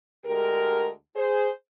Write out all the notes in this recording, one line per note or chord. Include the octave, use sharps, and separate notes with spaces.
D2 D3 G#3 G4 A#4
G#4 C5